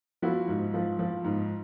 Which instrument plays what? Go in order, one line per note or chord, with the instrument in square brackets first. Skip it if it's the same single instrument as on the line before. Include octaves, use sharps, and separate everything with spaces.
[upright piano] F3 E4 F#4
G#2
F3
F3
G#2